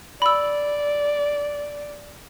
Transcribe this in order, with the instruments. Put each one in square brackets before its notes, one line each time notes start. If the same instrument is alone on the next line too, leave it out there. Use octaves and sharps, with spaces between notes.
[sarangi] D5 [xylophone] B5 E6